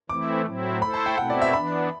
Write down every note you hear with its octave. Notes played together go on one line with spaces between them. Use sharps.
E3 A3 C4 E4 D6
A2 F#3 C4 E4
A3 E4 A4 C5 B5
A5
G5
B2 A3 C4 E4 F#5
D5
E5
E3 B3 D4 B5